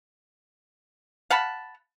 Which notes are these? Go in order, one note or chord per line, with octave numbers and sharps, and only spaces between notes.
F5 F#5 A5 B5